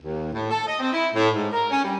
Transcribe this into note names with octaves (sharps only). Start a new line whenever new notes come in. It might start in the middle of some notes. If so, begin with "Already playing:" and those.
D#2
A2
A4
D#5
C4
E4
A2
G#2
A#4
C#4
G3